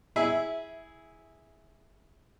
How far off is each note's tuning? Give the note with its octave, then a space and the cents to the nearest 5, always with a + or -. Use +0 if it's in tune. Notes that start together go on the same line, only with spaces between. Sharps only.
E4 -15 G#4 +0 E5 +0